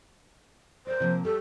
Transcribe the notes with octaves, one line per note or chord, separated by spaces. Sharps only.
A#4 C5 D5
C3 F3 A#3
G3 A4